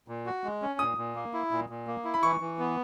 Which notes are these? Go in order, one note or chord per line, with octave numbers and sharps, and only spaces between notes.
A#2
F#4
G#3
C#4
A#2 D#6
A#2
A#3
E4
A#2
A#2
A#3
E4
B5
E3 C#6
E3
B3